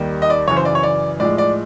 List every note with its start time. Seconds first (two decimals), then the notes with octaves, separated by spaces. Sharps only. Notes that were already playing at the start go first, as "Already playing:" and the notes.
Already playing: D#2 D#3 G3
0.22 D#5
0.30 D5
0.48 F#2 C#3 E3 C#5
0.57 C5
0.65 D5
0.75 C#5
0.83 D5
1.20 A2 F3 G#3 D5
1.38 D5